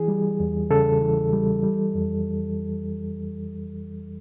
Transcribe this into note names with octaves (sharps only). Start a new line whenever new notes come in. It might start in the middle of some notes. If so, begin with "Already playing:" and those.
Already playing: E3 G#4
G3
E2
C#3 A4
E3
G3
G3
F2